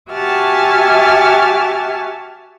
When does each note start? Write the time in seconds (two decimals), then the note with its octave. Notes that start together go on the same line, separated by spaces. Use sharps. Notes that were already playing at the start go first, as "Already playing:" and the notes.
0.11 F#4 G4 E5 G#5 A5 F6